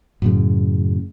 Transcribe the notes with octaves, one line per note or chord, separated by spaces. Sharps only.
F#2 A2 C#3